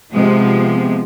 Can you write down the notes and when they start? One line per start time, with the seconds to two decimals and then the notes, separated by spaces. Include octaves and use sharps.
0.13 C3 F3 G#3 B3